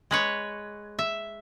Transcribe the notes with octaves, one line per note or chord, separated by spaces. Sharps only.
G#3 B4 C#5
E5